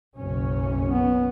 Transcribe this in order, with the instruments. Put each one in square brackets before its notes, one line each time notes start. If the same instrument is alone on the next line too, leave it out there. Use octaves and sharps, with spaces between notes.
[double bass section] F#1 B1 C#4
[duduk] B3